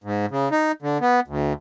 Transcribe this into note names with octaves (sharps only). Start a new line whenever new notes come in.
G#2
C#3
D#4
D3
B3
D2